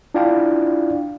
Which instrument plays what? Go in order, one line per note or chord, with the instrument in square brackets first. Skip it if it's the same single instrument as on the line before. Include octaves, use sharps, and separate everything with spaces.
[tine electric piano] D4 E4 F4 D5 F5 G5